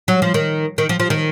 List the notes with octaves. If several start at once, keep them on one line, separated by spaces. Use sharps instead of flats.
F#3
F3
D#3
D#3
F3
F3
D#3